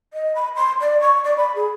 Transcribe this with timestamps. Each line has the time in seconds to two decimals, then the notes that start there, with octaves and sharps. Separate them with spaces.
0.13 D#5
0.35 B5
0.56 C6
0.81 D5
1.01 C#6
1.24 D5
1.37 B5
1.55 G#4